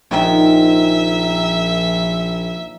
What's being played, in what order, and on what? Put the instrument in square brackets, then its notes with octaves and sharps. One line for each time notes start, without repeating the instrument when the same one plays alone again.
[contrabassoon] A#1 [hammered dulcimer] A#2 D#3 F3 [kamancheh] E5